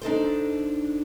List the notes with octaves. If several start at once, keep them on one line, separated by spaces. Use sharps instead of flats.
D4 D#4 A4 C5